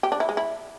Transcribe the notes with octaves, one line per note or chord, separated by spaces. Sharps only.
G4
D4
E4
G#3
E4